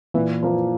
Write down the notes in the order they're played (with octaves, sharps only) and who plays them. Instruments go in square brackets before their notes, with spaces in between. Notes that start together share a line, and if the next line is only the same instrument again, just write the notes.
[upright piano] A#2 [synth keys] E3
[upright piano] F3 A#3